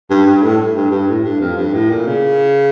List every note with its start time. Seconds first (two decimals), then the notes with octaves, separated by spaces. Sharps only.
0.11 G2
0.27 G2
0.43 A2
0.76 G2
0.91 G2
1.08 A2
1.24 G2
1.41 F2
1.57 G2
1.73 A2
1.90 A#2
2.07 C#3